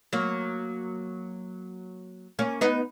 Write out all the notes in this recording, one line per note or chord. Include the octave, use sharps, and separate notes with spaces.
F#3 A#3
A#3 C#4
B3 D#4